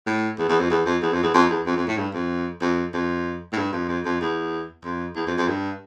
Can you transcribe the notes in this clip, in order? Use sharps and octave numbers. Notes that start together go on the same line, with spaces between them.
A2
E2
E2
F2
E2
F2
E2
F2
E2
F2
E2
F2
F2
A2
G2
F2
F2
F2
A2
G2
F2
F2
F2
E2
F2
E2
F2
F2
G2